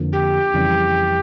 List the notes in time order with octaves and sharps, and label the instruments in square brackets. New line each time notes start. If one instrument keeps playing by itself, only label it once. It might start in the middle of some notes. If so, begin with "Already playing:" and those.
Already playing: [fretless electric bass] F2 D3 F3 A#3
[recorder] G4
[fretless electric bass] F2 C#3 E3 G3